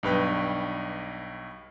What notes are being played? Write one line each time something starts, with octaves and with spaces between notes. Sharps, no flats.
B1 G2 B4 G5